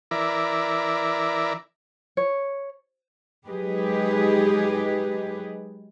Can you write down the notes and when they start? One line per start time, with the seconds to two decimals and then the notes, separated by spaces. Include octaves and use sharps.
0.11 E3 E4 A#4 D5
2.17 C#5
3.46 F#3 G#3 D#4 G4 G#4 B4